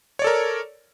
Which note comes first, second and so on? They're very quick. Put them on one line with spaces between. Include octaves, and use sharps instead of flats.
C#5 D5 A4 A#4